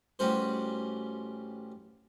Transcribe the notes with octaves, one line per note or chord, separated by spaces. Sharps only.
A1 G3 C#4 F#4 C5